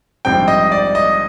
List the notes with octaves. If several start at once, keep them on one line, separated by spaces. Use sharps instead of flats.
A#1 G#2 G3 C4 G5
D#5
D5
D#5